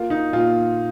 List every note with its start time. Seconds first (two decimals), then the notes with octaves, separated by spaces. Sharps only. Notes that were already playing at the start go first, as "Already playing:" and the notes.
Already playing: A#3 F4
0.10 D#4
0.32 A#2 F4